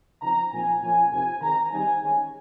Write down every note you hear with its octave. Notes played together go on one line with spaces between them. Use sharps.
C#3 F3 C4 D#4 A#5
A#2 F3 C4 D#4 G#5
A#2 F3 A#3 C#4 G#5
F2 C3 F3 A#3 D#4 G#5
D#3 G#3 C4 A#5
D#3 G3 C4 D#4 G#5
D#3 G#3 C#4